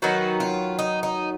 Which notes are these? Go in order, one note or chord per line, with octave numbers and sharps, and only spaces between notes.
D#3 F#3 B3 D#4 F#4
F4
D#4
D#4